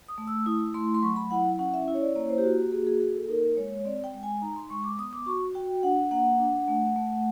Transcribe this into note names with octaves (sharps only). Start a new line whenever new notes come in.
D#6
A3
E6
E4 D#6
A3 C6
C6
F#3 C#6
B5
E4 F#5
C#4 F#5
E5
E4
C#5
D5
A#3 C#5
C5
G4
F#4
G4
A#3 G#4
G#4
A#3 G#4
A4
D#4 A#4
G#3 C#5
C4 D5
G5
G#3
G#5
D#4 A#5
C6
G#3 C#6
D6
B3 D#6
D6
F#4 C#6
F#4 G5
D4 F#5
A#3 F#5
D4
A3
A3